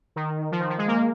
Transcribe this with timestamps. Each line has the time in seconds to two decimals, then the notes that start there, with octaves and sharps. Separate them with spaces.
0.16 D#3
0.52 F3
0.61 D#3
0.70 F3
0.78 G#3
0.88 A#3